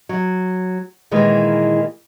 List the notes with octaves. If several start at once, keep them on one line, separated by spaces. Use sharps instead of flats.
F#3
A#2 D#3 E3 G#3 A#3